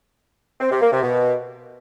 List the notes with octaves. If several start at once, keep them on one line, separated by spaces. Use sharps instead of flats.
C4
C3
A#3
C3
B2